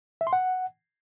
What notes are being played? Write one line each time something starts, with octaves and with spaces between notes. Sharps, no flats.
E5
C6
F#5